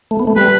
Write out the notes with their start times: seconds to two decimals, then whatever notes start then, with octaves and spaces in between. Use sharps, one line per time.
0.11 A3
0.19 B3
0.27 A3
0.36 G3 B4